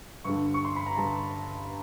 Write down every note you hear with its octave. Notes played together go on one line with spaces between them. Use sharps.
G2 D3 G3 C#6
C#6
C6
B5
A#5
G2 D3 G3 A5